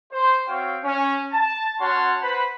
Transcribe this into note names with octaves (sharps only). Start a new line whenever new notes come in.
C5
C4 F#4 C#5 F5 G5
C#4
A5
C#4 F#4 C#5 F#5 A5 C6
B4 C5 F#5 B5